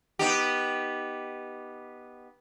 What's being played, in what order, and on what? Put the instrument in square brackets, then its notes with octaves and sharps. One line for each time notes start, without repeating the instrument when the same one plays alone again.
[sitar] B3 D#4 G4